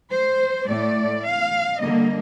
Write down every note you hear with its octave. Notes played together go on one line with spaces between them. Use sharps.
C5
A2 A3 D5
F5
D3 G3 A#3 D#5